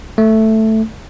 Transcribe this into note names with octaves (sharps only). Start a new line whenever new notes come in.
A3